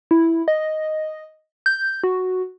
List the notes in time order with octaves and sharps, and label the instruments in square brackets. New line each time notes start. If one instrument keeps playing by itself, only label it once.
[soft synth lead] E4
D#5
G6
F#4